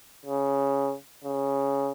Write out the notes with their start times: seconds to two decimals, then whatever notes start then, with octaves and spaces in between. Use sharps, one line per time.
0.26 C#3
1.24 C#3